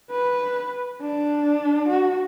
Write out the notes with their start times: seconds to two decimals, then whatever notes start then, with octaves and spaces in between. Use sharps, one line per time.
0.11 B4
1.01 D4
1.89 F#4